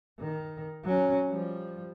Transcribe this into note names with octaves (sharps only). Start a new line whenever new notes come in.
D#3
F#3 C#4
F3 G3